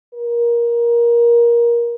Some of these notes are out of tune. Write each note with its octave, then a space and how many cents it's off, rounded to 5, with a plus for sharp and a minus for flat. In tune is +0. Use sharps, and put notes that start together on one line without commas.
A#4 +20